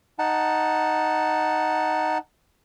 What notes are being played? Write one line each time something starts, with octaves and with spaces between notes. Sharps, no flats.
D#4 F#5 A5